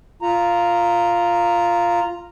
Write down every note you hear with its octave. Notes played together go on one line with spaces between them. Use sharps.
F4 A#5